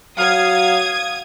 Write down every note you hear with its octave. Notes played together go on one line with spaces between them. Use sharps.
F#3 F5 D#6 G#6